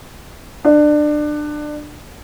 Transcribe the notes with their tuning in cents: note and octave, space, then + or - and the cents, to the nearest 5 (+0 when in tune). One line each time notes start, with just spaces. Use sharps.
D4 +25